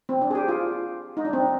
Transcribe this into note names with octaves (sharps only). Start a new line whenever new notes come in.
C4
D4
G#4
G4
F4
D#4
D4
C4